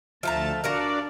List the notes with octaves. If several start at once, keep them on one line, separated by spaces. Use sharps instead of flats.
D2 F3 A3 A5 A#5
D4 F#4 A#4 D5 F5